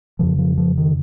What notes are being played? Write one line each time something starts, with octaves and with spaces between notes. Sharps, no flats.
F2 C#3 F3
F3
F3
D#3